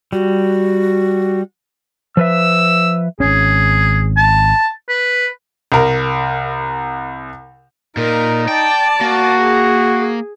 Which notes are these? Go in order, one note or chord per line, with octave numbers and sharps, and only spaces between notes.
G3 F#4
F3 B4 E5 E6
G#1 C#4 G#4
A5
B4
C2 A#4
A#2 D#4 A#4
D5 G5 A5
A#3 F#4
G#4